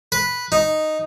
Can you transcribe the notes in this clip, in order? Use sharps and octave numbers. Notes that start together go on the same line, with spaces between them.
B4
D#4